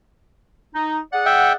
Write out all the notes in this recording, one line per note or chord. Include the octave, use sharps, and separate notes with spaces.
D#4
G#4 D5 F#5
E5 G5